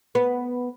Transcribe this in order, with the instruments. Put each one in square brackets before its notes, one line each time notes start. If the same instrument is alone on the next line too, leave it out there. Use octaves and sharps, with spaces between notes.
[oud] B3